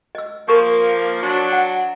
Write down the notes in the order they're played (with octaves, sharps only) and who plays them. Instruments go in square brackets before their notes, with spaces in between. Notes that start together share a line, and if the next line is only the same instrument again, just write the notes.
[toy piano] D#5 E6
[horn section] F3 A#3 [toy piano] A#4 C#6
[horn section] F#3 D4
[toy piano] F#5